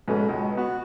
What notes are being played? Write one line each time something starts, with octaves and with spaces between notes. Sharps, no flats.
G#2 B2 A3 C#4
C#2
B3 F#4